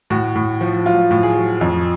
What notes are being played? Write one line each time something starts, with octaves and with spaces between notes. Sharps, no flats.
A2 F#4
A2
F3
F#3 F4
A2
G#4
F#3
F2